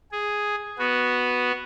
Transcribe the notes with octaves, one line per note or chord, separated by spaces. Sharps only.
G#4
B3 F#4